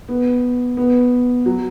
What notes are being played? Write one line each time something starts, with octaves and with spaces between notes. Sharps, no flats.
B3
B3
F#3